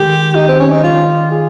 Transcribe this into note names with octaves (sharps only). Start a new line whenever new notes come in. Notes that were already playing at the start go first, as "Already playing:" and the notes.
Already playing: D#3 G#3 G4
D#4
C4
C#4
D#4
G3 F4
G#4